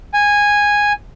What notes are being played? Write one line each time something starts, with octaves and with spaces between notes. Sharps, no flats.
G#5